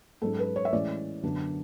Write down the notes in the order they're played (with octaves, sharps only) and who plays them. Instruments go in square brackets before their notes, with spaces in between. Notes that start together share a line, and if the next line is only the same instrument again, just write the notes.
[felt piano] G#2 F#3 C#4 A4
B4
C#5
E5
A2 E3 G#3 C#4 D5
F#2 D3 F#3 B3 D4